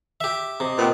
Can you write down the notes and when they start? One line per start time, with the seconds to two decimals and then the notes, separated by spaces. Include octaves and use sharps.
0.21 G4 E5
0.60 C3 D#5 D6
0.77 A#2 D#3 B3 C4